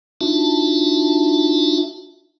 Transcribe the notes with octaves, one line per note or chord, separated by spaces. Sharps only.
D4 D#4 F4 F#4 E5 A5